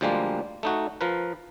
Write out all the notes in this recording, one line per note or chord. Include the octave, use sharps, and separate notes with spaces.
D2 F3 G3 G#3 A#3
A3 D#4 F#4
F3 A#4 B4